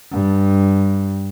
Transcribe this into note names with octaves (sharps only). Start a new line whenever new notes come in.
G2